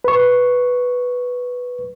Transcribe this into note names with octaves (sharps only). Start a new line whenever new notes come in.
B4 C#6